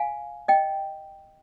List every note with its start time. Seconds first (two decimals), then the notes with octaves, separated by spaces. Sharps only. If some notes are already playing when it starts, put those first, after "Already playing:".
Already playing: F5 G#5
0.48 D#5 G5